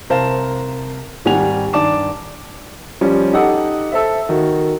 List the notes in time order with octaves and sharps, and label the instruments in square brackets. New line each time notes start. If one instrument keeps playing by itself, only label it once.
[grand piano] C2 A#4 C5 F5 A5 E7
G#1 D#3 G3 F#5 G#5 F7
G2 D#3 D5 A5 D6 E7
F3 G3 C#4
D#4 G4 A4 D#5 F#5 D#6
A4 C5 E5
D#3 F#4